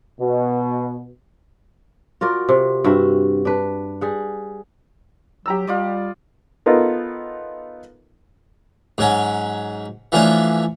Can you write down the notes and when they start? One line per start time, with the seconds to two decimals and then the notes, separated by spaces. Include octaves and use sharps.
0.21 B2
2.21 F4 F#4 A#4 D5
2.49 C3
2.84 G2 F#4 E5
3.45 D4 B4
4.01 G3 G#4 F#5
5.46 F#3 G4 A#5 E6
5.67 G3 F4 D5 D#5
6.66 B3 D#4 F4 A4 A#4
8.98 G#2 F#3 C#4
10.12 E3 F3 A3 C#4 D4 F4